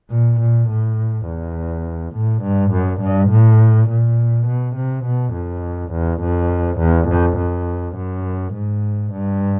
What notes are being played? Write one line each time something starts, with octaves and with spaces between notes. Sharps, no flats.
A#2
A#2
A2
E2
A2
G2
F#2
G2
A2
A#2
B2
C3
B2
F2
E2
F2
E2
F2
F2
F#2
G#2
G2